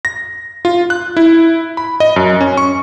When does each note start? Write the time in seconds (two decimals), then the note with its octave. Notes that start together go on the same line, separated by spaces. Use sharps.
0.05 A#6
0.65 F4
0.90 F#6
1.17 E4
1.77 B5
2.00 D#5
2.16 F#2
2.41 C#4
2.57 C#6